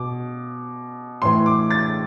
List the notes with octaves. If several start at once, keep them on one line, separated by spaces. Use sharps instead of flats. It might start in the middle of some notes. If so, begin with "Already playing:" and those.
Already playing: B2 D6
A2 E3 C6
D6
A6